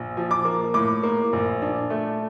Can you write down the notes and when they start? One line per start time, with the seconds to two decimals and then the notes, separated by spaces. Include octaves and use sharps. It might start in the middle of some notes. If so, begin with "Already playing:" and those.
Already playing: A#1
0.17 F3
0.31 D6
0.45 A#3
0.74 A2 D6
1.03 A#3
1.33 A#1
1.62 D4
1.90 A3